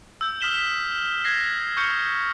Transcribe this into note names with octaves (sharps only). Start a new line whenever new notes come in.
E6 G6
D#6 F6 B6 E7 G7
F#6 G#6 A#6 C7
C#6 D#6 F6 G6 C#7